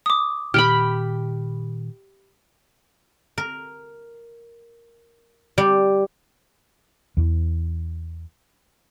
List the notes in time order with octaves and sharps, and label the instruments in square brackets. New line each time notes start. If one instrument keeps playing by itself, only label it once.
[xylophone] D6 D#6
[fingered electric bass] A#2 D#3 [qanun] G4 G5 B5 [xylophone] F6
[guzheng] A#4
G3
[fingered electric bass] E2 E3